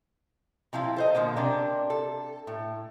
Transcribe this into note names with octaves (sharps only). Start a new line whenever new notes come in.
C3 F3 E4 F4
A4 C5 D#5
B2 D3 F3 A#3
C3 D4 A#4
A4
A2